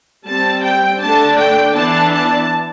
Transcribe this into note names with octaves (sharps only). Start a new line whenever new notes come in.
G3 C4 A5
G5
D3 A3 D4 A5
G5
E3 B3 D4 A5
A5